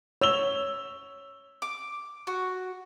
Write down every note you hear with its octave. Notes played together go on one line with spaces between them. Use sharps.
C#5 E6 F7 G7
D6
F#4